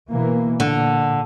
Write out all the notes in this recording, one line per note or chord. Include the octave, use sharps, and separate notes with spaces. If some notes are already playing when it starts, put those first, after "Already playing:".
B2 E3 A#3
A#2 D3